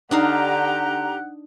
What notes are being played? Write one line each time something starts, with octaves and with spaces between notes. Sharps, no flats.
D3 D4 D#4 G4 F5 F#5 A#5